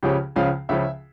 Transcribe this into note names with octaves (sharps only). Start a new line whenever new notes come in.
C#2 C#3 F3 C#4 G4
C#2 C#3 F3 C#4 F5
C#2 C#3 F3 C#4 E5